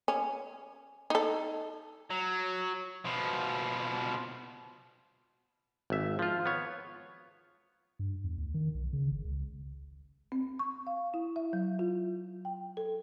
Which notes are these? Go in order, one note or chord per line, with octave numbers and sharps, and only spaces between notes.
C#4
D#4 A4
F#3
B2 F3
G#1 E5
F3 F4
B3 C#5
G2
E2
D2
D#3
B1
C#3
G1
C#2
C4
C#6
F5
E4
E5
F#3
F4
G5
A4